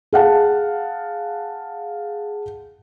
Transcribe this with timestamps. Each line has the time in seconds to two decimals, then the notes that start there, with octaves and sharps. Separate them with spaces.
0.13 G#4 F5 F#5 A5